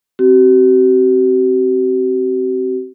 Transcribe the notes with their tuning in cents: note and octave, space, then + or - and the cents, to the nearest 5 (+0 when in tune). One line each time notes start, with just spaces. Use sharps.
C4 +0 F#4 +45